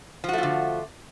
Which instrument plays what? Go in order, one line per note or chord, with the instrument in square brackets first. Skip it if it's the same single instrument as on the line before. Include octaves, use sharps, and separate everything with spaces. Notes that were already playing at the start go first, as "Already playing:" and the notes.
[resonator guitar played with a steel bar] F3
F#4
A3
F4
D3